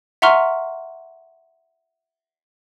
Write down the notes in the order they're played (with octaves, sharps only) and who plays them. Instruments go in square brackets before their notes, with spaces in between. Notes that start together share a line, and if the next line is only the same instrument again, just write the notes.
[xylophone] E5 F#5 A#5 C6 C#6 F6